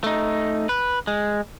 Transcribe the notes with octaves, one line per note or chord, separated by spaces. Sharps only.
A3 D#4
B4
G#3